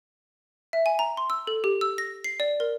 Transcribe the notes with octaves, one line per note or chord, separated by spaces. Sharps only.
E5
G#5
A#5
C6
E6
A4
G4
E6
A#6
C7
D5
A#4